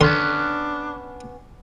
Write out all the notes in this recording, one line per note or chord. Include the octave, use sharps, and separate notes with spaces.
D3 B3 C#4 D4 C6